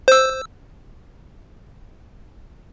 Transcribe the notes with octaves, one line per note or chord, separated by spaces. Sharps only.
C5 E6